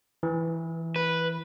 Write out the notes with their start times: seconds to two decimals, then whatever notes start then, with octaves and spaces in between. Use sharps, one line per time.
0.23 E3
0.96 B4